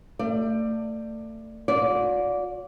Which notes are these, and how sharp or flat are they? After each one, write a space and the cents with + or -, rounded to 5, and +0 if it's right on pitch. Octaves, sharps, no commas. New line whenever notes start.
A3 +30 D5 +15
F#4 -45 D5 -15